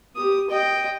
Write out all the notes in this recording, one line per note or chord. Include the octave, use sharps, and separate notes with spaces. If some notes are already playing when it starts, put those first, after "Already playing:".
G4 D#6
D#5 G5